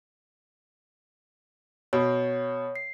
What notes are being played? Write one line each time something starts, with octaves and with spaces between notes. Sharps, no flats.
B2 C#5
C7